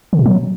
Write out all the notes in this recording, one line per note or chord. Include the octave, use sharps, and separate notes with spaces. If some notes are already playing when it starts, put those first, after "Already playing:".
D3
A#2
F#3